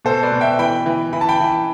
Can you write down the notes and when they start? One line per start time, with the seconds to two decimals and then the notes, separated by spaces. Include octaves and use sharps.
0.05 B2 A4 C5
0.23 B4 D5
0.32 B2
0.41 E5 G5
0.59 E3 G5 B5
0.86 E3
1.13 E3 B5
1.21 A5
1.29 G5 B5
1.41 E3